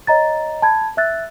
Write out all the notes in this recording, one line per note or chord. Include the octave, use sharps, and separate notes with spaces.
C#5 D#5 A#5 A6
A5 B5 G#6
E5 E6 F#6 A6